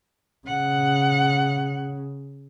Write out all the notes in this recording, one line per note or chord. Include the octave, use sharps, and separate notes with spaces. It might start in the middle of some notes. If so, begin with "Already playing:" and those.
C#3 F#5